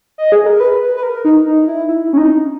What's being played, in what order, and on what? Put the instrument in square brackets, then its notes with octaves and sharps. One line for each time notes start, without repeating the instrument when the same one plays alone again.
[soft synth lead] D#5
G#4
A#4
B4
B4
A#4
D#4
D#4
E4
E4
C#4
D#4